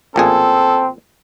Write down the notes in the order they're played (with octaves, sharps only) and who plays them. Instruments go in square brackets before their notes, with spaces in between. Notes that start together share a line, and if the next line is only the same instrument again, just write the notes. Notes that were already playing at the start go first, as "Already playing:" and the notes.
[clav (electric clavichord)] A1 A#2 G#4 [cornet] C4 [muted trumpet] A4